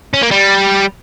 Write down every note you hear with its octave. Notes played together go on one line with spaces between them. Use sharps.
C#4
A#3
G3